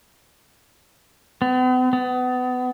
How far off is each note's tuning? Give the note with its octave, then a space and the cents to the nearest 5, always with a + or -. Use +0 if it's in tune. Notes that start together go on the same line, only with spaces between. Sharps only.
B3 +45
B3 +30